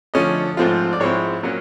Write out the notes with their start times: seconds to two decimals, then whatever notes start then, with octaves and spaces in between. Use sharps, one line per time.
0.14 D3 F3 A3 C#4 D#5
0.57 G#2 F3 A3 C4 F4
0.93 D5
1.00 G#2 F3 G#3 C4 E4 C#5
1.43 A#2 F#3 A#3 C#4